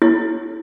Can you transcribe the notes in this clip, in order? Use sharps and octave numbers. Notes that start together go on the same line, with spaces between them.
E4